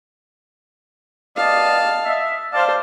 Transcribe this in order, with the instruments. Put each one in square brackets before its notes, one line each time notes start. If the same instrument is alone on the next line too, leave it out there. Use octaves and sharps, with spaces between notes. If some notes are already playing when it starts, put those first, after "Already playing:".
[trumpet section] B3 D5 D#5 [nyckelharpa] F5 A5
[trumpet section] D#5 E5
[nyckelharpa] C5 A5 [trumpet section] D5 F5